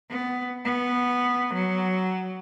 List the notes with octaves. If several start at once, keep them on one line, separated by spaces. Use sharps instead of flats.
B3
B3
F#3